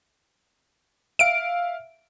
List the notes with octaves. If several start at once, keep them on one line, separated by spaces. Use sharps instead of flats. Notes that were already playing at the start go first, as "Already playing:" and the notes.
E5 F5 D7